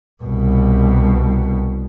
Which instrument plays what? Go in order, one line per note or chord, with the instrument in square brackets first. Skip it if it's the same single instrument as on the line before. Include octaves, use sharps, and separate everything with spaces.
[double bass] C2 B2